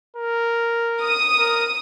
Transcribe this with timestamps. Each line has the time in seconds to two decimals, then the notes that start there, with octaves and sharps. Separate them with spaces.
0.17 A#4
1.02 D#6
1.37 A#4